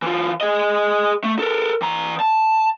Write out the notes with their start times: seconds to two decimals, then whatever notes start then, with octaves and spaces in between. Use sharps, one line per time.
0.02 E3 F4
0.41 G#4 D#5
1.24 A3
1.39 A4 A#4
1.82 E3 A#5
2.20 A5